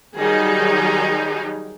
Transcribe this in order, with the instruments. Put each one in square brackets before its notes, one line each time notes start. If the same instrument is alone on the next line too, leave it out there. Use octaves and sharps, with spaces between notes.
[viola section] D#3 F#3 G3 D#4 G#4